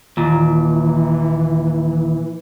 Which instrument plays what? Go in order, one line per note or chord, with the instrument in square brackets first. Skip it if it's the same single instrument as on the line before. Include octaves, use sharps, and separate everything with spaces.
[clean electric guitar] D#2 A#2 [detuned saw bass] E3 [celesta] F4